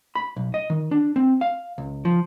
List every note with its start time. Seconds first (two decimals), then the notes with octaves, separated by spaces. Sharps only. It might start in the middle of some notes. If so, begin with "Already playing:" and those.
0.15 B5
0.36 B1
0.54 D#5
0.70 D#3
0.91 D4
1.16 C4
1.41 F5
1.78 C#2
2.05 F3